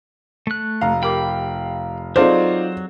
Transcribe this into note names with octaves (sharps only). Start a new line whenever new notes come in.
A3 F#6
F1 F5 A#5
G4 A#4 G5 B5 D6
F#3 C4 D#4 F4 G#4 A4 C5 D5